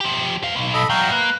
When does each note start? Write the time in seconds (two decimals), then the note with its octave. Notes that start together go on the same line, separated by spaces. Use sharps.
0.01 F3 G4
0.43 B4 F5
0.56 B1
0.74 A4 D#5 B5
0.90 E2 F#3 F5 G5 A#5
1.11 A#3 B4